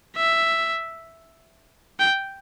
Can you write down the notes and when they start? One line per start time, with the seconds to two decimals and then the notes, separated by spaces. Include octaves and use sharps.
0.17 E5
2.00 G5